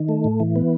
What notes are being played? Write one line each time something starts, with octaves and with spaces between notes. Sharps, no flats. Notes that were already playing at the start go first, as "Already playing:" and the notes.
Already playing: D#3
A3
A2
E3
B3